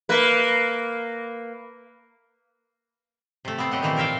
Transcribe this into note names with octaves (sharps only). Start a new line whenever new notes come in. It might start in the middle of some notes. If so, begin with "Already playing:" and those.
A#3 B4
C3 A3
B3 C4
F#3 G4 D#5 F#5
A#2 D#3 E3 A3 C4
A#3 A#4 E5 F5 G5